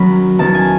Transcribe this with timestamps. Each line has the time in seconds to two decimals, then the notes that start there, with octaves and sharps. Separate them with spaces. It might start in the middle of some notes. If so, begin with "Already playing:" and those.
Already playing: D#3 F#3 C#4 B5
0.39 E2 D#3 F#3 C#4 A5
0.55 G#5